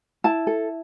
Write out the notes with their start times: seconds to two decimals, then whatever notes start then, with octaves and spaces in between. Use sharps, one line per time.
0.24 E4 A5
0.47 A4